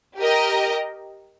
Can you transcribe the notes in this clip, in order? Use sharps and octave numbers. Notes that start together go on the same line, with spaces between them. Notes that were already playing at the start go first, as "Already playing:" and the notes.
G4 A#4 D#5